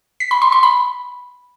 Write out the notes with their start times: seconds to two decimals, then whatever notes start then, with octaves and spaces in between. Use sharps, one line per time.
0.20 B6
0.31 B5
0.42 C6
0.52 C6
0.63 B5